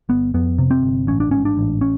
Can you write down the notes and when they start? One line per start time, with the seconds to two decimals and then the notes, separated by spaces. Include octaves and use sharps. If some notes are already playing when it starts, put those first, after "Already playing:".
0.09 G1 B3
0.34 F2 B3
0.59 C3
0.71 C4
0.83 G1
1.07 A1 C#4
1.20 D4
1.31 G#2 C#4
1.45 D4
1.57 A1
1.81 C#4